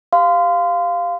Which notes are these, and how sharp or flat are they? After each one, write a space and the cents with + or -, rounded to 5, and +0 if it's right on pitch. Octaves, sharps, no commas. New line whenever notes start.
G4 +0 F5 +0 C6 -25